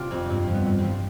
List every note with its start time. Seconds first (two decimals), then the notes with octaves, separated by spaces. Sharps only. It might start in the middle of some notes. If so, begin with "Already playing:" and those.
Already playing: C3 F3 D4 F4
0.11 F2 C4
0.30 G2 C4
0.48 F3
0.54 B3
0.66 G2
0.78 C4
0.84 F3